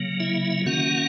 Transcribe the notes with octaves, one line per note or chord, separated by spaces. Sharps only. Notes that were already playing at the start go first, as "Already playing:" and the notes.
Already playing: C#3 F#3 A#3
E4 E5
D#3 A#3 C#4 F#4 F#5